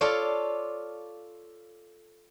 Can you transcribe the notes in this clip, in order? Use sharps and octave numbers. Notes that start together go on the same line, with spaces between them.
F4 A4 C#5 D5 F5